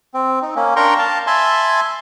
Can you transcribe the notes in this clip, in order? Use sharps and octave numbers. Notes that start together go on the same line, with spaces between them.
C4
D#4
A#3 C#4
D4 A#4 G5 A#5 C6 C#6
F5 A5
E5 G#5 A5 B5 C6